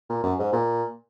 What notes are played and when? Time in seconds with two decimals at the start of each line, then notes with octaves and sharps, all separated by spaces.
0.09 A#2
0.23 F#2
0.39 G#2
0.53 A#2